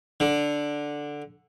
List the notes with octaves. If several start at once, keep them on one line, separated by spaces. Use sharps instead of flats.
D3